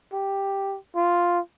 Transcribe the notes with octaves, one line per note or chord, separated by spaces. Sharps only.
G4
F4